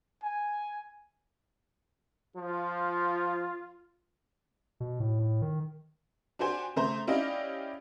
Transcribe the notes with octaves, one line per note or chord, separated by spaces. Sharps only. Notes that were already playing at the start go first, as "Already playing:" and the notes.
G#5
F3 F4
B2
A2
A2
D#3
D4 F#4 G4 C5 G#5
C#3 A3 C5 A#5
C#4 E4 G4 D5 D#5 F5